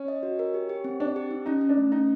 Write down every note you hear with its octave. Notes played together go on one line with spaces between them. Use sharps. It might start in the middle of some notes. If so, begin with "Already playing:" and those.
Already playing: C#4
D#5
F#4
A#4
G4
G4
C4
C4 D4
G4
D#4
C#4 D#4
C#4
D4
A3
C#4 D#4